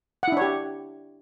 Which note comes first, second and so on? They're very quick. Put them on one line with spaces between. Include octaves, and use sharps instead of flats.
F#5 E4 D4 C#5 G4